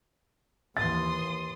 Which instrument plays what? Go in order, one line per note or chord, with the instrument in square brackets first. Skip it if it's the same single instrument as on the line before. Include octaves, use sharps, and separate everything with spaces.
[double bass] D#2 E3 [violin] C6 D#6 [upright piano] A6